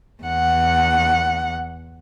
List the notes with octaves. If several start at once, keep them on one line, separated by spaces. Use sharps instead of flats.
E2 F#5